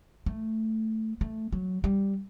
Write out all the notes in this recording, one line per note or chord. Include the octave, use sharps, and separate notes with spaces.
A3
A3
F#3
G3